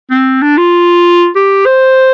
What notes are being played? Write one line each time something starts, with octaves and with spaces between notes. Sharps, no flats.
C4
D4
F4
G4
C5